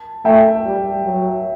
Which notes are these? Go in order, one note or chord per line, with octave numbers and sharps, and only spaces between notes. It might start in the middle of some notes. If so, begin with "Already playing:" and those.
Already playing: A5
A3 E5 G5
G3
F#3